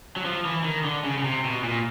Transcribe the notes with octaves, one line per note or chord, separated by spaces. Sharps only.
F#3
F3
E3
D#3
D3
C#3
C#3
C3
B2
A#2